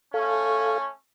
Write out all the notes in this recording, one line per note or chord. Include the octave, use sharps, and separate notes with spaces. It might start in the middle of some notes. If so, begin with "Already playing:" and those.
A3 C#4 A4 F5